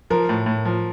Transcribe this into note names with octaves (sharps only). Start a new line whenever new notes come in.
F3 A#4
A2
A2
F3